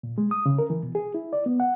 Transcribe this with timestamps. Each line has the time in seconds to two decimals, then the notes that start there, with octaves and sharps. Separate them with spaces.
0.03 A#2
0.18 G#3
0.31 D#6
0.46 C#3
0.58 A#4
0.70 E3
0.83 B2
0.95 G#4
1.14 E4
1.33 D5
1.46 B3
1.60 F#5